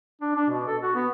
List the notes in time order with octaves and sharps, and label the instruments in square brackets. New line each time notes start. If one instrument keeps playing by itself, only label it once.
[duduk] D4
D4
B2
A4
F#4
B3